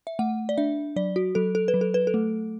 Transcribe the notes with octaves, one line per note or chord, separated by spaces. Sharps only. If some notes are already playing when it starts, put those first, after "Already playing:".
E5
A3 F#5
D5
D4 E5
F#3 D5
F#4
F#3 A4
A4
B4
F#3
A4
B4
A4
A3